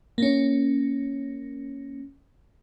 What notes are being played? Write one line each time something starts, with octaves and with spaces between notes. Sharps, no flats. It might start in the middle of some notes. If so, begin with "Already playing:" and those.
A#3 C#4